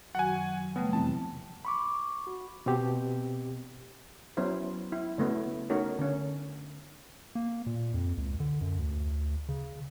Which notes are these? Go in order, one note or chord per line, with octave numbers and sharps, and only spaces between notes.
F#2 D#3 F#3 F#4 F#5 G#5
C#3 G3 A3 B3
F2 C3 E3 A5
B5 C#6 D6
F#4
B2 C4 G4
F#3 B3 C#4 E4 C5
E4
C#3 A3 B3 E4 F#4
A3 C#4 D#4 F#4 A#4 C#5
D3 C#4
A#3
A#2
F2
C#2
D3
F#2
D2
C#3